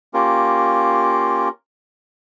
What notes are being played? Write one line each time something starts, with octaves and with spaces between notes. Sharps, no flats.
A#3 C#4 F4 G4 A#4